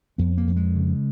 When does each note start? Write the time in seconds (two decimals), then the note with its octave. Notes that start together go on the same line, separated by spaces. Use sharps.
0.18 F2 B3
0.37 A#3
0.47 F2
0.56 G#3
0.76 C#3